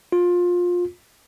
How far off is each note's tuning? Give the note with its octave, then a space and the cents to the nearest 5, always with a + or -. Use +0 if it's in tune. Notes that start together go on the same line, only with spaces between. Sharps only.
F4 +20